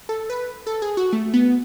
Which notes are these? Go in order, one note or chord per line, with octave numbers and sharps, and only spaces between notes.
A4
B4
A4
G#4
F#4
A3
B3